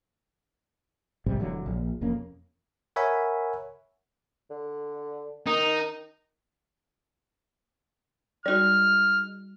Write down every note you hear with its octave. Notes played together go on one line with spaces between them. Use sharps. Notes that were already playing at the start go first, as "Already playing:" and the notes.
A#1 G#2 C3 G3
E1 D3 F#3
A#1
E1 F2 A#3 C#4
A#4 C#5 E5 F#5 G#5 B5
D3
D#3 D#4
G3 G#3 D#4 F#4 D5 F6